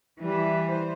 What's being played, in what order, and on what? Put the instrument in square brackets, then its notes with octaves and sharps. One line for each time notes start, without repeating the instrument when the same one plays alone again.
[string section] E3 [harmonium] G3
[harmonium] C5